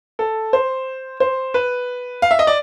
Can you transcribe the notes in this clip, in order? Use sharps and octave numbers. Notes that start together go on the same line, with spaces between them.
A4
C5
C5
B4
F5
E5
D#5
D5